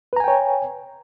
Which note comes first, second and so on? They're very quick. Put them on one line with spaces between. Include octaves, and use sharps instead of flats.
B4 A#5 G#5 G5 C#5